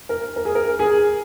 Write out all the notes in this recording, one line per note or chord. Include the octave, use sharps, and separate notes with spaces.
A#4
A#4
G#4
A#4
G#4